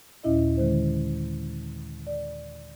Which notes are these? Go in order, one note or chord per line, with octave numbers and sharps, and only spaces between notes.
D#2 A#2 C#4 E4 D#5 E5
D3 D#3 G#3 C5
D5